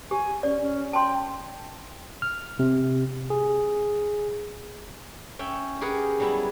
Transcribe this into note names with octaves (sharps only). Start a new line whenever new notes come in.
G4 G#5
C#4 D5
C#4
G5 A5 C6
F6
C3
G#4
C#4 E5 G5
G4 G#4 A#4 B4 F#5 G#5
F#3 G3 B3 E4